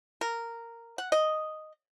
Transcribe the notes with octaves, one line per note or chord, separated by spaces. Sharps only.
A#4
F#5
D#5